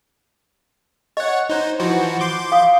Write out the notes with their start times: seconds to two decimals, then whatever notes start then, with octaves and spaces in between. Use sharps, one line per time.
1.17 C#5 D#5 F#5
1.49 D#4 C5
1.80 E3 F3 F#4
2.20 C6 D6 G6
2.52 F5 D#6